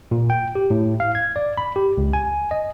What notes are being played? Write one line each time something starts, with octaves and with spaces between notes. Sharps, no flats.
A#2
G5
G4
A2
F5
G#6
D5
B5
G4
C#2
G#5
D#5